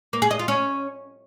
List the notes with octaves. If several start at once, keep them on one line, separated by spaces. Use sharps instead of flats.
A#3
G#4
D#5
F4
C#4